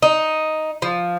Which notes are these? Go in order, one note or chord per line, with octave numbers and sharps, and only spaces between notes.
D#4
F3